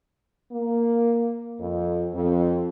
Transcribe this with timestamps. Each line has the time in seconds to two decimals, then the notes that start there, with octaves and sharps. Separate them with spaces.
0.52 A#3
1.61 F2
2.14 F2